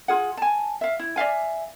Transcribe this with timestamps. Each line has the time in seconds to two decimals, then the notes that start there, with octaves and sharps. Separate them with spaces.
0.08 F4 G#4 F#5
0.37 G#5 A5
0.81 E5 F5
0.99 E4
1.16 D5 E5 F5 G#5